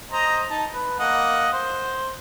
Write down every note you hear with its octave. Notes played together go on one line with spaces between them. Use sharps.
C5 D#5 A#5
D#4 A5
B4
A#3 D#5 F#5
C5